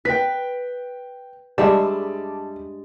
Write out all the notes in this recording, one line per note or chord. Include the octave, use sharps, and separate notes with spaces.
B4 G5 B6
G2 G3 G#3 D5 E5 A5